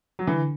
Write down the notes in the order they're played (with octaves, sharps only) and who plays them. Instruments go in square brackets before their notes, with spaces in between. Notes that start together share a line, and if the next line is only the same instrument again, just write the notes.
[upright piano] F#3
[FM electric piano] D3 [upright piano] E3